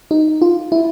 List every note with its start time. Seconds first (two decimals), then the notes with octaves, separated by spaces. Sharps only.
0.11 D#4
0.42 F4
0.72 E4